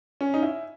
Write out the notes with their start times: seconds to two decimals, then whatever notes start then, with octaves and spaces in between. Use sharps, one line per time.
0.21 C#4
0.34 D#4
0.43 E4